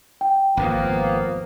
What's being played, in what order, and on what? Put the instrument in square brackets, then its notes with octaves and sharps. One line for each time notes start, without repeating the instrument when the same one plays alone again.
[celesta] G5
[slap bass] G#1 F2 A2 [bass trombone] F3 [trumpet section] A#3 B3